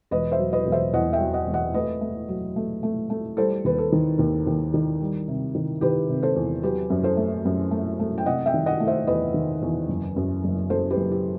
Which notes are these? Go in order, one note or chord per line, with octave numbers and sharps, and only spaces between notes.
E1 B4 D#5
C5 E5
F#3
B4 D#5
E1
C5 E5
E2 D#5 F#5
E5 G5
F#3
D#5 F#5
E1
D#5 F#5
A3 B4 D#5
A3
F#3
A3
A3
A3
G3 A4 C5
D#2 B4
A4
D#3
D#2
D#2
D#3
G3
C3
D#3
D#3 G4 B4
C3
A4 C5
E2
F#3 G4 B4
F#2
A4 C5
A3
F#2
A3
A3
G5
C3 D#5 F#5
E5 G5
D#3
D#5 F#5
A3
C5 E5
E2 B4 D#5
D#3
E2
F#1
F#2
F#1
F#1 A4 C5
G4 B4
F#1
G4